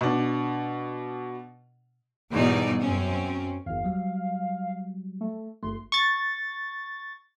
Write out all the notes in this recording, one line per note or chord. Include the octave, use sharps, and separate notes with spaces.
B2 D4
E2 G#2 B2 G3 D#4 D5
F#2 C4 C#4
G1 E2 F5
F#3 G3
A3
G1 A3 C6
C#6 A6